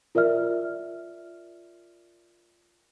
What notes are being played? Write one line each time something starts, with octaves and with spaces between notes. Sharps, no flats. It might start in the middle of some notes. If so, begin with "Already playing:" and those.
F4 A#4 D5 E5 F6